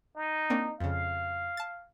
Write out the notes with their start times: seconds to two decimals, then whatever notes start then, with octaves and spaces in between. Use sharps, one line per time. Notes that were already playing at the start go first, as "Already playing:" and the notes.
0.16 D#4
0.50 A#3 C4 D4
0.80 F2 C#3 F5
1.57 A5 A6